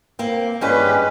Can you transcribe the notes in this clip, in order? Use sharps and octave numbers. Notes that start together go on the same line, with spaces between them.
A#3 C4
G2 G#3 C#4 G4 B4